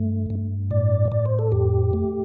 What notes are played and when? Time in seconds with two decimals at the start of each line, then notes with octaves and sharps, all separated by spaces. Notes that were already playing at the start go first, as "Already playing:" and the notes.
Already playing: G2 A3
0.30 G2
0.71 A2 D5
1.12 A2 D5
1.26 C5
1.39 A4
1.52 F2 G4
1.93 A3